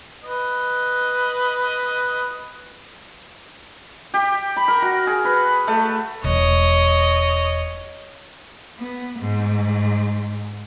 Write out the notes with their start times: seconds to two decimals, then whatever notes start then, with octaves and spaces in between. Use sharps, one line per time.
0.24 B4 D#5
4.14 G4
4.56 B5
4.68 A#4
4.82 F#4
5.07 G#4
5.25 B4
5.68 A3
6.24 E1 C#5 D#5
8.79 B3
9.19 G#2